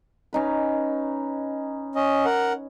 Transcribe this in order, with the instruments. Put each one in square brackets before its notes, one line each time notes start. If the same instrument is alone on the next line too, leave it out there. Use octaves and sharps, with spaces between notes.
[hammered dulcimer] C#4 D#4 B4
[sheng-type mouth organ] C#4 D#5
A#4 F#5